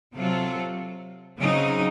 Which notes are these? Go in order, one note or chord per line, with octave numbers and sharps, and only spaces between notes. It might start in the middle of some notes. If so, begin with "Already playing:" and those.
C3 F#3 C4 F4 A4
C#3 F#3 C4 D#4